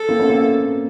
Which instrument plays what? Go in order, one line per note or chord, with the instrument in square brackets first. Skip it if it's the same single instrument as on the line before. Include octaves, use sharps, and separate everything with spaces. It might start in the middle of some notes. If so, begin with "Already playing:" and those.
Already playing: [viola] A4
[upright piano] A#3 C4
B3 C#4
A#3 C4